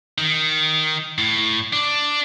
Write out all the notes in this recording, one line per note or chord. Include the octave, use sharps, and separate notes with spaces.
D#3
A2
D4